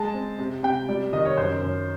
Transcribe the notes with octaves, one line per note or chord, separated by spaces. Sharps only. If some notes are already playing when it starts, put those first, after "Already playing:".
Already playing: G#3 A5
C4
C3
C3 G5
G3 D5
D#3 D#5
C#5
F#2 C5
F#2